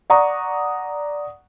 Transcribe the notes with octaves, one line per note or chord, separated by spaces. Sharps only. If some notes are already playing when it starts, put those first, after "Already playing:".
D5 F#5 A#5 C#6 D#6